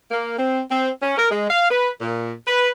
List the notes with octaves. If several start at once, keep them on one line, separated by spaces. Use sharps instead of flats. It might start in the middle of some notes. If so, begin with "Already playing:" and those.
A#3
C4
C4
C#4
A#4
G#3
F5
B4
A#2
B4